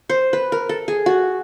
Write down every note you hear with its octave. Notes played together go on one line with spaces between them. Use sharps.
C5
B4
A#4
A4
G#4
F#4